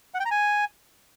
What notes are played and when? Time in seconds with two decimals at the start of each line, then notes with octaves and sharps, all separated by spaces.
0.14 F#5
0.20 G5
0.25 A#5
0.31 G#5